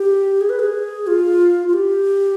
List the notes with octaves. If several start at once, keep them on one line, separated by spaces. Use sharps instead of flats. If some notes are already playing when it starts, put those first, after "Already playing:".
Already playing: G4
G#4
B4
G#4
F4
F4
G4